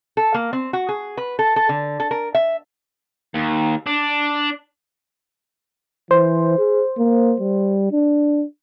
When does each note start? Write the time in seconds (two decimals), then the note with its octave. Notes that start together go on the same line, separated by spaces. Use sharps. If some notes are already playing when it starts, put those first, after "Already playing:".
0.17 A4
0.34 A#3
0.53 C4
0.73 F#4
0.89 G#4
1.17 B4
1.39 A4
1.56 A4
1.69 D3
2.00 A4
2.11 A#4
2.35 E5
3.35 D#2
3.87 D4
6.11 E3 C5
6.58 G#4
6.98 A#3
7.40 G3
7.92 D4